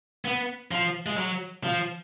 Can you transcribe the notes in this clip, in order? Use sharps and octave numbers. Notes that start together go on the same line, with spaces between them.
B3
F3
G#3
F#3
F3